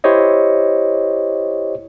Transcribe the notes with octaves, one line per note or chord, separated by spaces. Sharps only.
E4 G4 C5 C#5 D#5